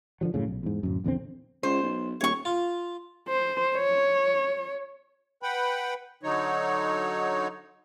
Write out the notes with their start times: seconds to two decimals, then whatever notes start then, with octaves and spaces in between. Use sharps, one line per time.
0.21 D3 F3 F#3
0.34 F#2 A2 C#3
0.48 B1
0.63 E2 G#2
0.83 D1 F#2
1.04 A#1 E2 D3 C4
1.63 C#2 C5
1.83 B1
2.21 D#1 C#5 C#6
2.45 F4
3.28 C5
3.75 C#5
5.43 B4 F#5 G5 B5
6.23 D3 F#3 D#4 C#5